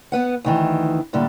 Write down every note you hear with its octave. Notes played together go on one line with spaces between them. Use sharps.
B3 B4 F#5
D2 D#3 E3
A2 D3 G3 A#3